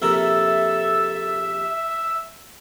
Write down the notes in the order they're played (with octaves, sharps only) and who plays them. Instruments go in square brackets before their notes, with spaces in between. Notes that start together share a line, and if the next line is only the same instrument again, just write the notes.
[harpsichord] A#1 C3 A#4 [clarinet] A4 [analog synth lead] E5